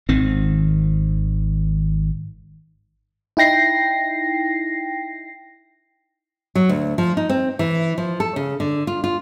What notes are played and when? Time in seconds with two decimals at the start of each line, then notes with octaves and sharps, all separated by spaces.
0.09 G#1 D#3 C4
3.37 D#4 E4 G5 A#6 C7
6.55 F#3
6.69 D2
6.98 F3
7.17 D#4
7.29 C4
7.59 E3
7.98 F3
8.20 A4
8.36 C#3
8.60 D3
8.87 F4
9.04 F4